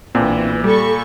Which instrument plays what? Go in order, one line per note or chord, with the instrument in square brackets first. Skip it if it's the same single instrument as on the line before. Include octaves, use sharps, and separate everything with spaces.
[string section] B1 E3 [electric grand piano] A#2 [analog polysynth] C4 D4
[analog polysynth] G3 [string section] A4 B5 C#6